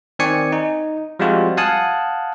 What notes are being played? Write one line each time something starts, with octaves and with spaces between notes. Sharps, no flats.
D#3 C4 D5 G#5 C#6 C#7
D#4
F3 G3 G#3 C4 F4 F#4
F5 F#5 G#5 A5 D#6 F#6